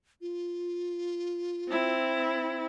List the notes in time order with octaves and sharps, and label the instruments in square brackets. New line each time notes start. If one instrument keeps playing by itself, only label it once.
[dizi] F4
[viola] C4 E4